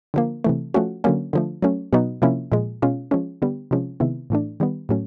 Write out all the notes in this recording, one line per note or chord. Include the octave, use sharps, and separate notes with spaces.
D3 F3 A#3
C3 E3 A3
F3 A3 C#4 F#4
D3 F#3 A#3 C#4
D3 F3 A3
F#3 A3 C#4
B2 F#3 B3 D#4 F#4
C3 F3 A#3 C#4 E4
A#2 F3 G#3
B2 G#3 C#4 F4
F3 G#3 C#4
D3 G3 B3
C3 F3 G#3 C#4
C3 D#3 G#3 B3 E4
A2 E3 A3 D4
D#3 G3 B3
A2 F#3 A3 C#4